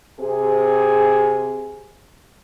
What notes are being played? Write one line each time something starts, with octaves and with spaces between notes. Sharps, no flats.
C3 G#4